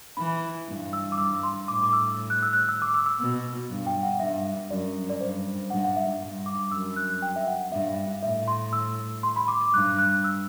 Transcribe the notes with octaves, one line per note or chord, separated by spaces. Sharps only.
E3 B5
G2
E6
D6
G2 E6
C6
A2 D6
D6
E6
F#6
E6
F#6
E6
D6
E6
E6
B2
G2
G5
F#5
G2 E5
F#2 D5
D5
G2 C5
G2 F#5
F#5
E5
G2
D6
F#2 E6
F#6
G5
E5
F#5
G2 E5
A2 E5
C6
E6
C6
B5
D6
D6
G2 F#6
F#6
E6